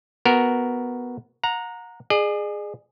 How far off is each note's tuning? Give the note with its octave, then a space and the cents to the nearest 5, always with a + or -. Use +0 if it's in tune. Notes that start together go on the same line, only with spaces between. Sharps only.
B3 +0 F#4 +0 A#4 +0
F#5 -35 A#5 +0
G#4 +0 D5 +45